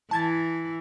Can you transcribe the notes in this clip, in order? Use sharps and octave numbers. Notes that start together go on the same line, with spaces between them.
E3 A5 G#6 A6